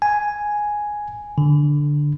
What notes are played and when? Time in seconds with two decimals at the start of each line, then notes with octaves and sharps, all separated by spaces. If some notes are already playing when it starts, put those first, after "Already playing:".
0.02 G#5
1.38 D3